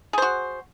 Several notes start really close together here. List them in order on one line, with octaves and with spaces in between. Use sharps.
G#4 C5 F#4